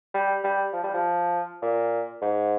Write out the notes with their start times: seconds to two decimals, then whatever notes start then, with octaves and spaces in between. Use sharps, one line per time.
0.14 G3
0.44 G3
0.73 F3
0.84 G3
0.94 F3
1.62 A#2
2.22 G#2